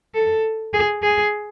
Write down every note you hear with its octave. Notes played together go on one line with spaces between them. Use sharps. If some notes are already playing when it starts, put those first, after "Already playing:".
A4
G#4
G#4